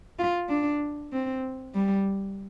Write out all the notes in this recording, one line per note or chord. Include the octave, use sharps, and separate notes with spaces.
F4
D4
C4
G3